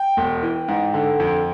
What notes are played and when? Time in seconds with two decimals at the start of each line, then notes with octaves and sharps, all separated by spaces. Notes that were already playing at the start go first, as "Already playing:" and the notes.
Already playing: G5
0.17 E1
0.43 E3
0.68 G#2
0.94 D3
1.20 F2